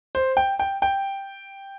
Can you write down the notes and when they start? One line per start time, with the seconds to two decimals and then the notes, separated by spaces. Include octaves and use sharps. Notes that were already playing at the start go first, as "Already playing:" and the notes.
0.15 C5
0.37 G5
0.59 G5
0.82 G5